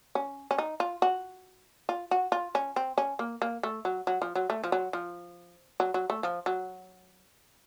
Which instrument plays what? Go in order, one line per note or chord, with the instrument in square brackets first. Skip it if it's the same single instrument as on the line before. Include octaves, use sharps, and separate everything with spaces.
[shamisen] C#4
C#4
D#4
F4
F#4
F4
F#4
F4
C#4
C4
C#4
A#3
A#3
A3
F#3
F#3
F3
F#3
A3
F3
F#3
F3
F#3
F#3
A3
F3
F#3